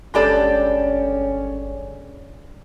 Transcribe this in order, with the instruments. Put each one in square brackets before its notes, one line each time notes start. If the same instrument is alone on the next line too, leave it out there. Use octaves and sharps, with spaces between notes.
[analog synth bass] G1 [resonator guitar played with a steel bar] G#3 G4 A4 [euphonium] C#4 [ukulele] D4 D5 B5